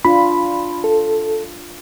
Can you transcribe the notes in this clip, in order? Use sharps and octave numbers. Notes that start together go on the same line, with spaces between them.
D4 F4 B5
A4